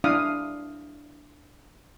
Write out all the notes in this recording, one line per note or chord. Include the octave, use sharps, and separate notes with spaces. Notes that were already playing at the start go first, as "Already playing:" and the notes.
D4 E4 F5 D#6